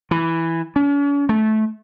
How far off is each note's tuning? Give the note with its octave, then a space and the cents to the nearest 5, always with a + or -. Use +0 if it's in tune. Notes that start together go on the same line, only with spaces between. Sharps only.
E3 +0
C#4 +45
A3 -20